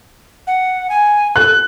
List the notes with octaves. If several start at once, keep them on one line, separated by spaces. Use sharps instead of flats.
F#5
G#5
A4 F#6